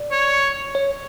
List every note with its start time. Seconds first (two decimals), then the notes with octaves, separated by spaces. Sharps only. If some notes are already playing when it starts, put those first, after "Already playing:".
Already playing: D5
0.11 C#5
0.75 C#5